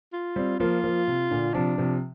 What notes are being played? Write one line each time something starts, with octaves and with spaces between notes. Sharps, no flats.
F4
G3 C4
F3 A#3 F4
F3 A#3
C3
A#2 D3
C3 F3 D4
C3 F3